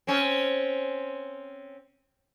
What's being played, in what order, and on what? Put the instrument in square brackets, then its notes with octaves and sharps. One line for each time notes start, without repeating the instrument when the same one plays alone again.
[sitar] C4 C#4